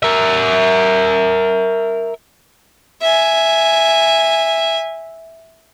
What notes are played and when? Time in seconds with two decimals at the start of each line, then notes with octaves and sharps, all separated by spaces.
0.03 A#4 E5
3.02 E5 G#5